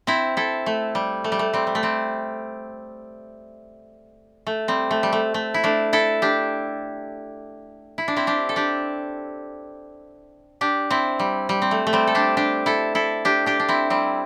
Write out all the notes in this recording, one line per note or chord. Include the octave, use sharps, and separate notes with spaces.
C4 E4
E4 A4
A3
G3
A3
G3
A3
G3 C4
G3
A3
G3 C4
A3
G3 C4
A3
G3
A3
A3
E4
A3 D4
E4 A4
D4 G4
E4
D4
C4 E4
D4 G4
A4
D4 G4
D4 G4
C4 E4
G3
G3
C4
A3
A3
G3 C4
A4
D4 G4
D4 G4
E4 A4
E4 A4
D4 G4
D4 G4
D4
C4 E4
G3 C4